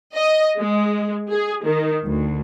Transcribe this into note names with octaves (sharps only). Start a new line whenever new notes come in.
D#5
G#3
G#4
D#3
D2